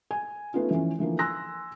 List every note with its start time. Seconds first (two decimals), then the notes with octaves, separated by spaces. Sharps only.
0.11 G#5
0.54 A3 B3 C#4 D#4 F4
0.71 E3 F3 C#4
0.99 D3 E3 F3 A#3
1.19 G#5 C6 E6 F#6 A#6